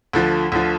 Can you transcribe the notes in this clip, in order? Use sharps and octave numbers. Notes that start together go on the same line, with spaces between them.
D2 D3 F3
D2 D3 F3